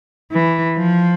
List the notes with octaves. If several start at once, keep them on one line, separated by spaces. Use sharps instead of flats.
E3
F3